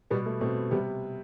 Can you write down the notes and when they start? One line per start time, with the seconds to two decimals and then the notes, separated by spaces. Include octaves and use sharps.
0.10 B2 G3 B3
0.26 A3
0.41 B2 A3 C4
0.71 C3 G3 B3